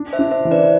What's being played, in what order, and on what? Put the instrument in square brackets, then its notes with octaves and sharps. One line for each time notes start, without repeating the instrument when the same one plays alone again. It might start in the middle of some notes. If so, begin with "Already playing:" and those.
Already playing: [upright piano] D4
[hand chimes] C5 E5
[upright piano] D4
[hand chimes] C5 E5
[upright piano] E3
[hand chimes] B4 D5